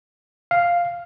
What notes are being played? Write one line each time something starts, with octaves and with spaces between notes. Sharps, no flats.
F5